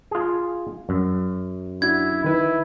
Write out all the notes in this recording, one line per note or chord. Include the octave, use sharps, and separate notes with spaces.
F4 G#4
F#2
D4 E4 F#4 G#6
D#3 E4 B4